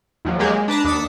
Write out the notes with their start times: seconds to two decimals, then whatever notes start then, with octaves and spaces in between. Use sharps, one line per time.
0.25 D#2 F3 F#3
0.39 F#3 G#3 A#3 G4 G#4
0.53 G#3
0.68 D4 B4 A5 A#5
0.84 D#2 D4 A5 D#6 B6 C#7